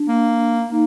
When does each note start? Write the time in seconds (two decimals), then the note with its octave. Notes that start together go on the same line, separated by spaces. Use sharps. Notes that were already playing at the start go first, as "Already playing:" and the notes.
Already playing: D4
0.08 A#3
0.71 A#3 D#4